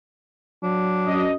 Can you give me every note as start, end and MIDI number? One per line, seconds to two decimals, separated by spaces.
0.63 1.23 54
0.63 1.30 62
1.06 1.33 42
1.06 1.33 75